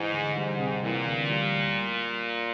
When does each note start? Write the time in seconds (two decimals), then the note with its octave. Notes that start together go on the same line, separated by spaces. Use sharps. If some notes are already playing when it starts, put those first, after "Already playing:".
Already playing: G#2 E3
0.12 D2
0.35 G#2 G3
0.59 C3
0.82 A#2 E3
1.06 D2
1.30 G3